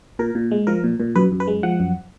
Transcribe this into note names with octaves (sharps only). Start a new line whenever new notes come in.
A#2 A#4
A#2
G#3
F3 A#4
A#2
A#2
F#2 B4
F#2
B4
G#3
F3 F#5
F#2